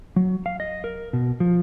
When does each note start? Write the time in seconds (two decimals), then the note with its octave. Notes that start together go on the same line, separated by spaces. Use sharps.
0.16 F#3
0.46 F5
0.60 D#5
0.84 A#4
1.13 B2
1.40 F3